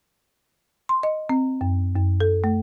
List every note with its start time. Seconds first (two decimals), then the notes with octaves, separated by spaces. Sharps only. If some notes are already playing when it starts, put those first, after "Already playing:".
0.89 C6
1.03 D#5
1.29 C4
1.61 F#2
1.96 F#2
2.20 A4
2.44 A3